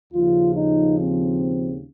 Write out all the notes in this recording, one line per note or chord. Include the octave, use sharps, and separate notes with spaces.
D#2 C#3 F3 F4
D#4
C4